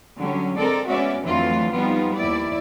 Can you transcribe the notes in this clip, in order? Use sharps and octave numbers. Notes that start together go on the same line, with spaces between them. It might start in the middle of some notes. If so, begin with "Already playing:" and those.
D3 F#3 G3 C#4
G#3 C4 A4 A#4 D5
G#3 B3 C#4 F#4 D5 E5
F2 D3 E3 F#3 A3 F4
F3 G3 B3 D#4 F4
D#2 E4 D5